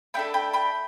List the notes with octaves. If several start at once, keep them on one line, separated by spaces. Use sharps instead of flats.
A3 D4 A4 G5 B5
G5 B5
G5 B5